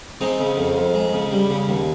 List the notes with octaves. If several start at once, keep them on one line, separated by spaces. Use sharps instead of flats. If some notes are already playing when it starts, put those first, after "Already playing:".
G#3 C4 D#4
C#3
F2
F2
G#3
C#3
G3
C#3
D#2